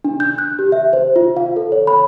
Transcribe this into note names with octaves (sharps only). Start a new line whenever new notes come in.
D4
G6
F#6
G4
E5
C5
F4
F5
A4
C#5
B5